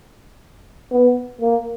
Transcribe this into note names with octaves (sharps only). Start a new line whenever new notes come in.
B3
A#3